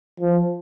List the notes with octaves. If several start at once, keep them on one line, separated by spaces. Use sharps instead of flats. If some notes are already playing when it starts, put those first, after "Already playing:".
F3